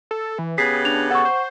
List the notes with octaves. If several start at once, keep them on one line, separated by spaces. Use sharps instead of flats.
A4
E3
C#3 B3 G4 G#4 B6 C7
D4 F7
A4 F#5 C#6
C5